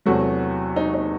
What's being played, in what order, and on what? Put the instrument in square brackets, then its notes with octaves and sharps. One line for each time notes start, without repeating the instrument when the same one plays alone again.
[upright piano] E2 C3 F#3 A3 F#4
D#4
D#4